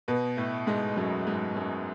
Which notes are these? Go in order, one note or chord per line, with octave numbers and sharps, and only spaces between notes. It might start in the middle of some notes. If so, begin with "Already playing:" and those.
B2 B3
A2 A3
G#2 G#3
F#2 F#3
G#2 G#3
F#2 F#3